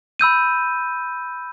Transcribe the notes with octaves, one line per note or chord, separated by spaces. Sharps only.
B5 E6 G6 D#7